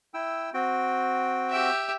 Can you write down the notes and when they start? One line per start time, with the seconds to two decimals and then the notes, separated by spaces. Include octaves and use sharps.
0.14 E4 G5 E6
0.54 C4 F#4 G5
1.50 G4 E5